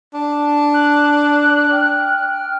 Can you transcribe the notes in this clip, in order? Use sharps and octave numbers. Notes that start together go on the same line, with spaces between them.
D4
F#6
G5 F6